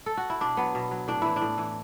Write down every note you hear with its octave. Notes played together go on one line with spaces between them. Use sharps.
A4
F#4
E4
B2 D4
F#3 B3
B2
F#3
A2 D4
E3 E4
D4
A2
E3